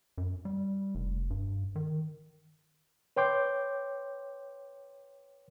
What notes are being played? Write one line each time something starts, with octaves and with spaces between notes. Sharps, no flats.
F#2
G3
F1
G2
D#3
B4 C#5 G5 C6 D6 G6